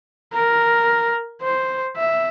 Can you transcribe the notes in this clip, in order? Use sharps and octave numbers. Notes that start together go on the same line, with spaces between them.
A#4
C5
E5